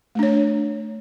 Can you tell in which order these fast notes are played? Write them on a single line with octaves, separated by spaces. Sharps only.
A3 D4 C#5